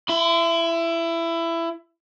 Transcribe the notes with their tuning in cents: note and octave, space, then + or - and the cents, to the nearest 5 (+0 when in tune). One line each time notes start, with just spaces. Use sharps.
E4 +20 C6 -40